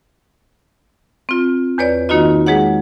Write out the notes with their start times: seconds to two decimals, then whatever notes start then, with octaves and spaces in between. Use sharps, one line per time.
1.29 C4 F4
1.78 E2 B4 C#5 D5
2.09 D#3 A#3 D#4 F4 F#4 D#5
2.46 G#3 G#4 C#5 F#5